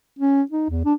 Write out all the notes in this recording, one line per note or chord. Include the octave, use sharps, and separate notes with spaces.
C#4
D#4
E2
D4